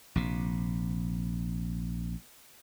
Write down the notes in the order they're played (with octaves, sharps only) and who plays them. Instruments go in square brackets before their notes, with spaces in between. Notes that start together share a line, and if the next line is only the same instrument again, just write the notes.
[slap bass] A#1 C3